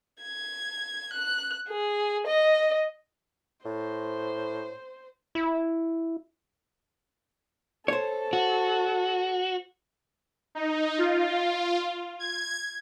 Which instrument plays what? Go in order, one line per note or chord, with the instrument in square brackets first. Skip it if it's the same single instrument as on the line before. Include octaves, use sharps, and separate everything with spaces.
[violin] G#6
F#6
G#4
D#5
[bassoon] A2 [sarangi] C5
[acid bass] E4
[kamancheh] A4 [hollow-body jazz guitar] C5 C#5
[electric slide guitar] F#4
[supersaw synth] D#4
F4
G#6